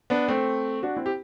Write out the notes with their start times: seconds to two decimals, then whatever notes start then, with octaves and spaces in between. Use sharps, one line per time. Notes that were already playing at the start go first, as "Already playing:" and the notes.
0.10 B3 D4
0.28 A3 C4
0.83 D4 F#4
0.97 C4 E4
1.06 G4